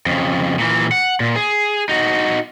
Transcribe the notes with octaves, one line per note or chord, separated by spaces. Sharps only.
F2 C#3
A#2 E3
F#5
A#2
G#4
D#4 F#4